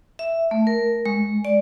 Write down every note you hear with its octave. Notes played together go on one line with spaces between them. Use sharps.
E5
A3
A#4
G#3
D5